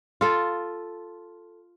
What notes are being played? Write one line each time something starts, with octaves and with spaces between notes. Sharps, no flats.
F4 A4